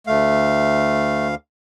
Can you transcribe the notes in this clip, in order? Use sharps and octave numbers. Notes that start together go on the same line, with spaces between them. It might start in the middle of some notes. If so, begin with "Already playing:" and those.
D2 A3 F5